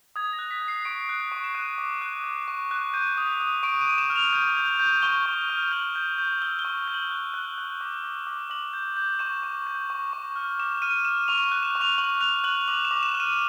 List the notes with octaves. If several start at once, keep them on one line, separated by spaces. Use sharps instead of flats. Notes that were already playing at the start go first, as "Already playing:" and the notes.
D#6 G#6
A#6
F#6
B6
F#6
C7
C#6 D7
F#6
C#6
E7
F#6 D#7
D6
F#6
F#6
C#6
F#6
G6 D#7
D#6
D#6
C#6 D7
D#7
C#6
E7
F6
F7
G6
G6
G6
C#6 G7
C#6
F6
G6 F#7
G6
G6
E6 G7
G7
C#6
G6
F#7
F#6
F#6
F#6
D6
D6
D6
D6 F#7
G6
G6
C#6 E7
C#6
G6
C#6
C#6
F6
D6 E7
F6 D#7
F6 E7
C#6 F7
F#6
E7
C#6
F7
C#6 F#7
F#6 F7
F#6 F#7
D6 F#7
E7
D6
E7
F6
D#7